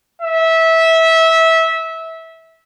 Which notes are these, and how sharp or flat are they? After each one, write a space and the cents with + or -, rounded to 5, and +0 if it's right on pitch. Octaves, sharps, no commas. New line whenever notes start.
E5 -20